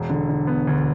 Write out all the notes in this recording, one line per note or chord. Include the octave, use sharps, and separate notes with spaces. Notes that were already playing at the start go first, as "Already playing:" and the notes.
Already playing: E1
D3
D3
B3
D2